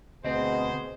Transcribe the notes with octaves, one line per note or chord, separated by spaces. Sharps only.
D2 B2 C4 G#4 C5 D#5